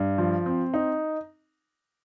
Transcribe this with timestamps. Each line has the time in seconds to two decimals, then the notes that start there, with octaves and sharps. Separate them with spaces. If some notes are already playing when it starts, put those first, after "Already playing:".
Already playing: G2
0.18 F3
0.46 C4
0.74 D#4